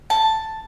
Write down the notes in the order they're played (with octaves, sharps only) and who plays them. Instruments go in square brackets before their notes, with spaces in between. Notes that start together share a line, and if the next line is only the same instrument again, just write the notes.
[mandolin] A5